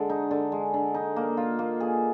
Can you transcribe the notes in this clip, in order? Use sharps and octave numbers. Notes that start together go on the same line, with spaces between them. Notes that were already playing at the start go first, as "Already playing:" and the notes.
Already playing: D3 G#3
D#4
D3
G#3
D3
D#4
A#3
F4
A#3
G#4